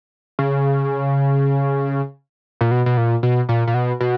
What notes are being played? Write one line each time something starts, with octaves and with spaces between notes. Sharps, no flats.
C#3
A#2
B2
B2
A#2
B2
A#2
A#2
B2
B2